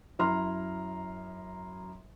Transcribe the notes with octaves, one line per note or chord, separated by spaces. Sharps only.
F#2 E4 A#5 C6 F6